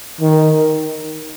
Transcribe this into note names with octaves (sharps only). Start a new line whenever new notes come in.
D#3